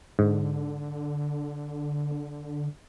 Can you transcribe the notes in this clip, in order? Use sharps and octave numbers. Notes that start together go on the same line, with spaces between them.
G#2 D3